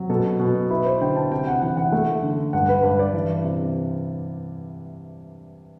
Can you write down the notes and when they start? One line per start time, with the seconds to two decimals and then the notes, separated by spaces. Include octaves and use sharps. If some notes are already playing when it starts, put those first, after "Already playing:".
Already playing: C3 F#3
0.10 B2 A4
0.40 B2
0.70 E4 B4
0.86 C5
1.01 D3 G5
1.16 A5
1.31 C3 G5
1.47 F#5
1.62 E3 F#5
1.77 F#5
1.92 A3
2.23 D3
2.53 G2 F#5
2.69 B4
2.83 G2 B4
2.99 D5
3.14 E3
3.44 C3